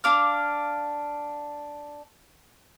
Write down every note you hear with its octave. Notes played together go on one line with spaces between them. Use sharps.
D4 F5 D6 F6